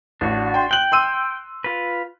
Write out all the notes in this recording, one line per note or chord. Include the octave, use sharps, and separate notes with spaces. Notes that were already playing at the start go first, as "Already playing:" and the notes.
A1 D4 F#4
G5 C6
G5 F#6 F#7
C6 E6 D#7
F4 B4